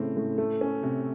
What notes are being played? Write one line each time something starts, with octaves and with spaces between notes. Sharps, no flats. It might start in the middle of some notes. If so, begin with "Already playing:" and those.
Already playing: A2 C#3 C4
A2
A3
C#4
C3